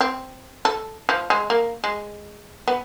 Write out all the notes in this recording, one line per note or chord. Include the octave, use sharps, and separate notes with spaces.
C4
A4
F3
G#3
A#3
G#3
B3